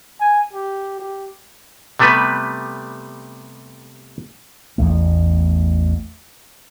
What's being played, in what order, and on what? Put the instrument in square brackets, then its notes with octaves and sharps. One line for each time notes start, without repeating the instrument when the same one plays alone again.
[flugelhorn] G#5
G4
G4
[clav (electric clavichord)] C3 G3 A3 B3 B4
[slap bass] A1 E2 G2 A3